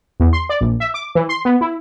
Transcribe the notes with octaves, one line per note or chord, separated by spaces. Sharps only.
E2
C6
D5
A#1
E5
D6
E3
C6
B3
E4